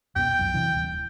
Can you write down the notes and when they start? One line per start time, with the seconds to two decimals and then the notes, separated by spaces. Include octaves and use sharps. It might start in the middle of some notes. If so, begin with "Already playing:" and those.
0.16 F2 B2 B3 G5
0.39 C2 F#2 C3
0.54 C3 E3
0.74 D#1